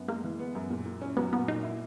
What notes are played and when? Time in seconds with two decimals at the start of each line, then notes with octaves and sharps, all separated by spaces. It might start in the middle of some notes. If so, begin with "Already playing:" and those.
Already playing: F#2 B3
0.08 G#3 A#3
0.24 E3
0.39 B3
0.55 F#2
0.70 A#2
0.86 A#2
1.02 C#4
1.17 F#3 B3
1.33 A#2 B3
1.48 A#2 D#4
1.63 E4